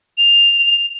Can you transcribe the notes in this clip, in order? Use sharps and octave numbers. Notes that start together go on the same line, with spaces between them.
F7